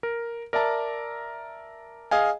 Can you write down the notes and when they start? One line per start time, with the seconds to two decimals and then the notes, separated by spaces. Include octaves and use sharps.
0.03 A#4
0.53 A#4 D5 E5 A5 A#5
2.11 G#4 D#5 F5 G#5